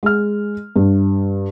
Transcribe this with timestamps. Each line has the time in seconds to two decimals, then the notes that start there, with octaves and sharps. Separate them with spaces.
0.03 G#3 F6
0.76 G2